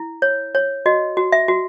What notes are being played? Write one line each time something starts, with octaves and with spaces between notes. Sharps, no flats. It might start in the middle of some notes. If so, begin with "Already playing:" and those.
Already playing: E4
C#5
C#5
F#4 D#5
F#4
E5
F#4